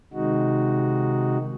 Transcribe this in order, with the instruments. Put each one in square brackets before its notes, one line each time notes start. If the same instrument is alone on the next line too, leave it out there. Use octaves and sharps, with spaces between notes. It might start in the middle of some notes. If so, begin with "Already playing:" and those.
[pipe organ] C3 D#3 G#3 D#4 F#4